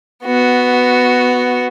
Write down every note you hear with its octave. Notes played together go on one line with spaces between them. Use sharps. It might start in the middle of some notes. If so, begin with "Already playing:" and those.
B3 F#4